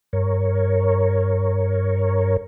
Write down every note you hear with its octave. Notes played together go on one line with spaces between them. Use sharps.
G2 A#4 C#5